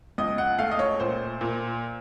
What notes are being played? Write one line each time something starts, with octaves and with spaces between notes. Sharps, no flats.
C#2 D#5
F#5
A3 F5
D#5
C#5
A#2 C5
A#2